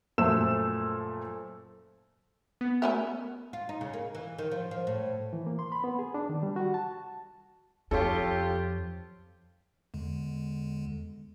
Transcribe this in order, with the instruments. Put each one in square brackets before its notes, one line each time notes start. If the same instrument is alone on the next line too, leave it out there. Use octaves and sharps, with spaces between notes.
[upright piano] F#2 A#2 F3 A3 E6 E7
[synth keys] B3
[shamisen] A3 C#4 A#4 [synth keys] E5
[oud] F4
D#4
C#3
A#3
E3
D#3
F3
F3
A2
[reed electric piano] E3
A#3
C6
B5
B3
G#4
D4
D#3
G3
F#4
A5
[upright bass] F2 [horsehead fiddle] F4 G4 [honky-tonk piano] A4 C#5
[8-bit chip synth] E2 D3 G#3